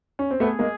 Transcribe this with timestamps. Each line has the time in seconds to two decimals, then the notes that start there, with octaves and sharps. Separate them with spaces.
0.19 C#4
0.31 C4
0.40 A3 B3 G#4
0.59 G#3 A#3